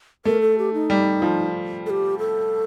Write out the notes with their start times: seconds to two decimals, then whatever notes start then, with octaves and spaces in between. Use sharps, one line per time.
0.25 A3 A#4
0.41 A4
0.58 G4
0.74 D#4
0.90 G3
1.22 F3
1.86 A4
1.90 G4
2.19 A4